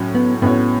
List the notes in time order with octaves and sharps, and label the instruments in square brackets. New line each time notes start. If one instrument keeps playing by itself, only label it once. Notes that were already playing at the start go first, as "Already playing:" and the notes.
Already playing: [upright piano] A2 F#3 C#4 F#4
[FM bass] B3
[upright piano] A2 F#3 C#4 F#4 C#5 [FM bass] B3